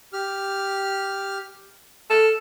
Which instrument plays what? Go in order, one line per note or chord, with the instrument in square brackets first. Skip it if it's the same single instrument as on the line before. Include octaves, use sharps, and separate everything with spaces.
[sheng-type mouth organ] G4 F6
[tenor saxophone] A4 [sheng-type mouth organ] F6